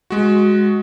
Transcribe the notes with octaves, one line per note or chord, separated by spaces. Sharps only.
G#3 F#4